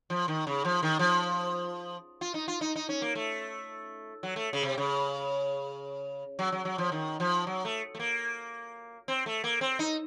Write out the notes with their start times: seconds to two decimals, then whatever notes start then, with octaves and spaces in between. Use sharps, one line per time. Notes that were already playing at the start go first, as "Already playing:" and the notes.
0.10 F3
0.28 D#3
0.47 C#3
0.65 F3
0.83 D#3
0.99 F3
2.21 F4
2.34 D#4
2.48 F4
2.61 D#4
2.76 D#4
2.89 C#4
3.02 A#3
3.15 A3
4.23 F#3
4.36 A3
4.53 C#3
4.63 C3
4.78 C#3
6.39 F#3
6.52 F#3
6.65 F#3
6.78 F3
6.92 D#3
7.20 F3
7.47 F#3
7.65 A3
7.95 A3
7.99 A#3
9.08 C4
9.26 A3
9.44 A#3
9.61 C4
9.79 D#4